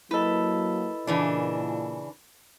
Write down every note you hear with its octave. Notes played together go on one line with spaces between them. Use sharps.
F#3 A#3 E4 A4 B4 D#5
A#2 C#3 E3 D4